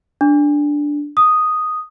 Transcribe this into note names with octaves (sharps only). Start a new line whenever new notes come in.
D4
D#6